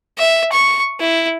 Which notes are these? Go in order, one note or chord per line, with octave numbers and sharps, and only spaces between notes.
E5
C#6
E4